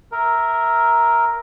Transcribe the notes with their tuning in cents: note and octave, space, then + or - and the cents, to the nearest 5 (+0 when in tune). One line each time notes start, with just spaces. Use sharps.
A#4 +0 E5 -10